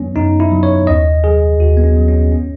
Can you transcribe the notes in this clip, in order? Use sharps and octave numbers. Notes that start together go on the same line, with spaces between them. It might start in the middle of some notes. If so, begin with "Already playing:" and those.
Already playing: F#2 D#3 F#3 B3 C#4
F#2 D#4
E4
D#3 F#3
C#5
D#2 D#5
D#3 F#3 G#4
D#2 F#4
B3
C#4
D#3 F#3
C#4
C#4